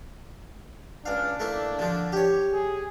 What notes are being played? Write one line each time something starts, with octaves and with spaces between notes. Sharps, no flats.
C#2 D4 F5
A3 A#3 E4
D3 F3
G4 C#5
G#4